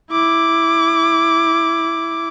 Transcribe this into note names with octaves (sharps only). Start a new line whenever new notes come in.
E4 D6